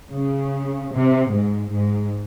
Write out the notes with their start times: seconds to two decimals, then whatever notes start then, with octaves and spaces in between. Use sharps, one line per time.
0.14 C#3
0.93 C3
1.32 G#2
1.71 G#2